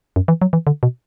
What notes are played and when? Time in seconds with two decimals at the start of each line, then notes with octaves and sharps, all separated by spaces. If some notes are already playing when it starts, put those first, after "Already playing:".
0.16 F#2
0.28 E3
0.42 F#3
0.53 E3
0.67 D3
0.83 B2